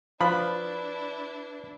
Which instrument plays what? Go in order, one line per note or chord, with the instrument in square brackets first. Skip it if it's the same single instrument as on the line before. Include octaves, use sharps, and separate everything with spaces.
[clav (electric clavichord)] F3 [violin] D4 E4 [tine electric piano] B4 [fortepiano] B5